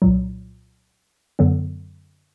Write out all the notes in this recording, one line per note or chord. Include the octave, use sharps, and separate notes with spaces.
C2 A#2 F#3
F#2 D3 F#3 B3